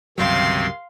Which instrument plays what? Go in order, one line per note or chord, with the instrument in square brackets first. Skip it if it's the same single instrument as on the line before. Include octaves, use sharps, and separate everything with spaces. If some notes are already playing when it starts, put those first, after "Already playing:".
[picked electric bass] C#2 G2 F#3 [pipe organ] C3 D#3 C4 [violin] F5 C6